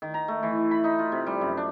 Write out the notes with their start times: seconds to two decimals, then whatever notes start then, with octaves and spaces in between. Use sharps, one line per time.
0.02 D#3
0.14 A#5
0.28 A3
0.43 E3
0.71 B5
0.84 D#4
0.99 F4
1.12 C3
1.27 G3
1.41 F#2
1.57 D4